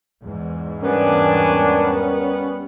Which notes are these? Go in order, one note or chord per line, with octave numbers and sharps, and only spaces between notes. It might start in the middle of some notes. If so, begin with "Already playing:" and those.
E2 G#2
G3 B3 C#4 D4 A#4 G#5